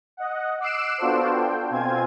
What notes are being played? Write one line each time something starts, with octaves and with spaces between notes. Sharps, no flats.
D#5 F#5
D6 E6 F#6 C7 D7 E7
B3 D4 F4 F#4 A4 C5
G5
B2 C4 F4 G#5 G#6